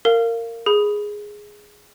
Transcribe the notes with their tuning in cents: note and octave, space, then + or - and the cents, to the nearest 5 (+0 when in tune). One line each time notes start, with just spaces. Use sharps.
A#4 -20 F5 -10
G#4 +0 B5 +0